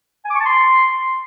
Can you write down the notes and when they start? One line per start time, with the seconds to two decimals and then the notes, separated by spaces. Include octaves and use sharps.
0.25 G#5
0.30 D6
0.35 C#6
0.40 A5
0.46 C6